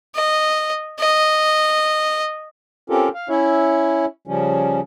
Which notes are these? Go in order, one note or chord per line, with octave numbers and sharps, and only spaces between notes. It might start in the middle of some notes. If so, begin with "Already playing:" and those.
D#5
D#5
C4 C#4 F4 G4 A4 A#4
F5
C#4 E4 C#5 E5
C#3 F3 G3 C#4